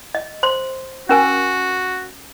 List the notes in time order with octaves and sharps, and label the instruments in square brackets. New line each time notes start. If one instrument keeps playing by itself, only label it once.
[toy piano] D#5
C5 C6
[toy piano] C#4 A#4 G#5 [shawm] F#4